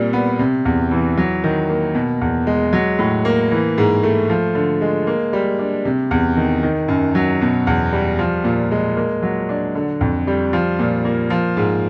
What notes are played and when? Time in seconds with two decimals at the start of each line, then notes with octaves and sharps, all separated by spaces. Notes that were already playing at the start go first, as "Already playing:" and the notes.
Already playing: A#2 G3 C4
0.13 B3
0.39 C3
0.65 E2
0.91 E3
1.17 F#3
1.44 D#3
1.69 A#3
1.95 B2
2.21 E2
2.47 G#3
2.73 F#3
2.99 A2
3.25 A#3
3.51 E3
3.78 G#2
4.03 A3
4.30 F3
4.55 D3
4.81 G#3
5.07 A#3
5.33 G3
5.59 D4
5.85 C3
6.11 E2
6.37 D#3
6.63 D#3
6.88 F#2
7.15 F#3
7.41 B2
7.67 E2
7.93 G3
8.19 F3
8.44 A#2
8.71 G#3
8.97 A#3
9.22 F#3
9.49 D4
9.75 D3
10.01 F2
10.27 G3
10.53 F3
10.79 A#2
11.05 A#3
11.30 F3
11.57 G#2